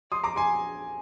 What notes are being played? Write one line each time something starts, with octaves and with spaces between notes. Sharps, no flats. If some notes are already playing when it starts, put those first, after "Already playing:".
C6 D#6
A#5 D6
G#5 C6